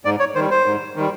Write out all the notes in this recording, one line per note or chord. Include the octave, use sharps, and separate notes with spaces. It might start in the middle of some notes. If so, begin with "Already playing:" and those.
G#2 D5
C#5
D#3 G3 C5
C5
G#2
D#3 G3